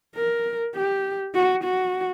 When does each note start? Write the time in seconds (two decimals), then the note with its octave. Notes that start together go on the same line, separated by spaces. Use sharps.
0.15 A#4
0.75 G4
1.34 F#4
1.64 F#4